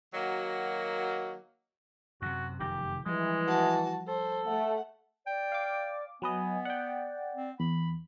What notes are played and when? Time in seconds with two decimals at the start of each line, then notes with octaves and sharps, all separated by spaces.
0.13 D#3 F#3 A#3 F#4
2.22 F#2 C3 F#4
2.60 F1 F#2 D#3 G4
3.06 E3 F3 G3 G#3
3.47 F#4 A5
4.08 A4 C5
4.46 A3 F#5
5.27 D5 G5
5.52 F5 D6
6.22 F#3 B3 B4 D#5 G#5
6.65 D5 F#5 G5
7.34 C4
7.60 E2 B5